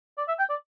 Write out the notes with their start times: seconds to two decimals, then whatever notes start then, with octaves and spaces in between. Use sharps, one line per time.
0.18 D5
0.28 E5
0.39 G5
0.50 D5